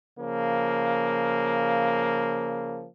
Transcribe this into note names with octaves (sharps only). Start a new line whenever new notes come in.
C#3 F3 A#3